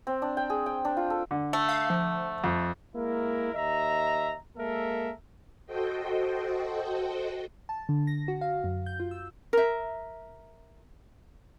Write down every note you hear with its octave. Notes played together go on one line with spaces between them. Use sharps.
C4
D4
G5
G#4
G5
D4
F4
A4
D3
A3
F5
F3
F2
G#3 A#3 E4 A#4
D#2 D#5 E5 A#5
G#3 A#3 A4 A#4 E5
F#4 A4 C5 D#5 G5
A5
D3
A#6
F#4
F5
F#2
G6
F4
E6
A#4 E5